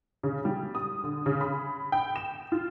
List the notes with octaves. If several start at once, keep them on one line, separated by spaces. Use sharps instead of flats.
C#3
G3
D#6
D3
C#3
B5
G5
E7
F4